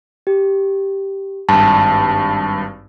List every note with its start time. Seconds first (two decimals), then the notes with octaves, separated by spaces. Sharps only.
0.27 G4
1.49 G#1 G2 A5